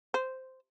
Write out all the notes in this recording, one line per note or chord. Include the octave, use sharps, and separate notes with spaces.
C5